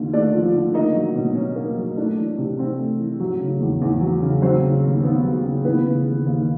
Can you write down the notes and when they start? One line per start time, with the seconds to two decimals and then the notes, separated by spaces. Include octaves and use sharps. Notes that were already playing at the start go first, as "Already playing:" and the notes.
Already playing: D#2 D3 F3 E4
0.13 A3 D4 D5
0.34 F3
0.54 D3
0.74 A#3 D#4 D#5
0.95 F#3
1.15 B2
1.35 C#4
1.56 A#3
1.77 F#3
1.97 A3 D4 D5
2.17 E3
2.38 C3
2.59 C4
2.78 A3
2.99 E3
3.20 F#3
3.40 C#3
3.60 E2
3.81 E2
4.01 F#3
4.22 C#3
4.42 F#3 C4 C5
4.63 C#3
4.83 D#2
5.03 B3
5.24 F#3
5.44 C#3
5.65 E3 B3 B4
5.86 C#3
6.05 D#2
6.26 D#2